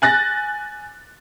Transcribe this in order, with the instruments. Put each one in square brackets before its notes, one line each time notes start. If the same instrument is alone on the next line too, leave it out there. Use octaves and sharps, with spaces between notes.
[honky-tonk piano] G#5 F#6 A6 A#6